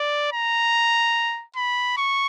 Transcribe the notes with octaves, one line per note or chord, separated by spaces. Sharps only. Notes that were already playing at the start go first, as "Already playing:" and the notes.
Already playing: D5
A#5
B5
C#6